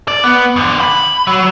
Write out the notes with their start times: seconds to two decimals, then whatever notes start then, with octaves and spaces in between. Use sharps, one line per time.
0.08 D5
0.24 B3
0.56 F2 D3
0.81 B5
1.27 F#3